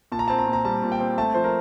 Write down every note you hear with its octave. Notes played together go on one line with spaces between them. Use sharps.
A#2 A5
A#5
C4 A5
A#5
A#2
A#5
G3 A5
A#2
G5
C4
A3 A5
F3 C5
A#4